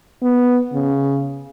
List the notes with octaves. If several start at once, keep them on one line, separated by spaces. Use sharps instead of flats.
B3
C#3